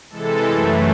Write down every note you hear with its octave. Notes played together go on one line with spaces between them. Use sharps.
C3 E3 G#3 A4
F#2 E3 A3